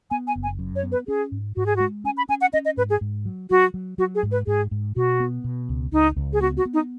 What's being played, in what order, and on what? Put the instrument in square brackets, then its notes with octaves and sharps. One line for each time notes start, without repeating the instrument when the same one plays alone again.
[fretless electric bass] B3 [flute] G#5
[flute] G#5
[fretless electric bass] F#1
[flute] G#5
[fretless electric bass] F#2
[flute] C#5
[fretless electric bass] B3
[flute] B4
[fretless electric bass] C#4 [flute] G#4
[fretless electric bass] G#2
[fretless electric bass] G#2 [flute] F#4
[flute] G#4
F#4
[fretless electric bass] G#3
[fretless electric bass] C#4 [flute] G#5
[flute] B5
[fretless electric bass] C#4 [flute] G#5
[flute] F#5
[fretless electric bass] C#4 [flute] D#5
[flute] D#5
[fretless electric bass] G#2 [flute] B4
[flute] G#4
[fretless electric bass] G#2
F#3
[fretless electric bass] F#3 [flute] F#4
[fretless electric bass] F#3
[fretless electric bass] F#3 [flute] F#4
[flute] G#4
[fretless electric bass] G#2
[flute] B4
[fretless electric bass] G#2 [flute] G#4
[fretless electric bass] G#2
[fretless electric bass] B2 [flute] F#4
[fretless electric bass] B3
B2
C#2
[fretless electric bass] C#2 [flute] D#4
[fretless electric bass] C#2
[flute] G#4
[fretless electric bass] B3 [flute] F#4
[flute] F#4
[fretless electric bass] B3
[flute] D#4